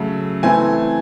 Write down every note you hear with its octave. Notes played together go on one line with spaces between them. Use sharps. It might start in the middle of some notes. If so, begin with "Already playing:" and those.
Already playing: C#3 F#3 A3
E3 A3 C4 G#5